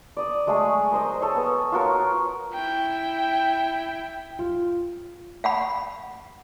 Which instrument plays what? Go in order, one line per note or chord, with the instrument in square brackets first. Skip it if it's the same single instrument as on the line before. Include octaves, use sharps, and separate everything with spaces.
[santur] D5 D#6
F#3 G#3 A3 G#4
A#4 C5 D#5
A4 C#5 D#5
B3
F4 F#4 A#4 C#5
[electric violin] E4 G5
[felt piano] F4
[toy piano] F5 F#5 B5